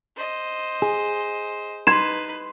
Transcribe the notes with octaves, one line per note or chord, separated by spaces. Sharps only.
C5 D#5
G#4
D#4 B4 C6 G#6 E7